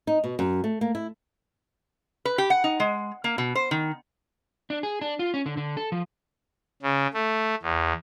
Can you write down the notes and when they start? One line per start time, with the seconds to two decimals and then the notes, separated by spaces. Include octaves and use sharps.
0.07 D#4
0.24 B2
0.39 F#2
0.64 A3
0.81 A#3
0.95 E4
2.25 B4
2.38 G4
2.50 F#5
2.64 D#4
2.80 G#3
3.24 A#3
3.38 B2
3.55 C5
3.71 D#3
4.70 D4
4.83 G#4
5.01 D4
5.19 F4
5.34 C#4
5.46 D3
5.57 D3
5.77 A4
5.92 F3
6.82 C#3
7.14 A3
7.62 E2